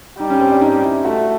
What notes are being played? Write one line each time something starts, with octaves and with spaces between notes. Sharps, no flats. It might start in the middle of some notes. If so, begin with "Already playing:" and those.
G3 D#4
C#4
C4
D4
D#4
E4
A3 F#4